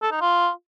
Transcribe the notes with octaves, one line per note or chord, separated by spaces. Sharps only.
A4
D#4
F4